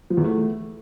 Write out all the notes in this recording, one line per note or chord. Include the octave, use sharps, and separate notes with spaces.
F3
E2
A3